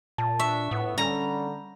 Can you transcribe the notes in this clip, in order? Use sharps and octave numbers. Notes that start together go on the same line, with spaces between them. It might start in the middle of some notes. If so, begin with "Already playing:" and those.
A#2 A5
D4 E5 C#6
A2 B3
D3 G3 C#4 A#5